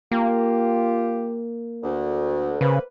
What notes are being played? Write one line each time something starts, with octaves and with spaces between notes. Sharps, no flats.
A#3 F4 G4
D2
C#3 A#3 C4 B4